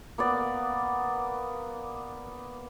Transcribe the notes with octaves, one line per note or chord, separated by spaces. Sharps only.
A#3 B3 D5